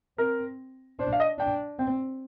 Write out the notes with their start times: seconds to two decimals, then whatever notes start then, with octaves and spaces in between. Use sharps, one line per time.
0.18 C4 A#4
0.99 D4 C5
1.13 F5
1.20 D#5
1.39 D4 G5
1.79 C4 G5